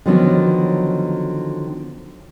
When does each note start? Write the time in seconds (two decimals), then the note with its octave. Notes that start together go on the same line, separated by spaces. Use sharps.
0.06 D3 D#3 F3 F#3 B3 C#4